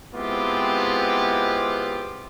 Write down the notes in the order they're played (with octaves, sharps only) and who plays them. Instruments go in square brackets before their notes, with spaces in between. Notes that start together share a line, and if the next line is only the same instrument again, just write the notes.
[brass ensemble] G#3 B3 C4 E4 F4 G4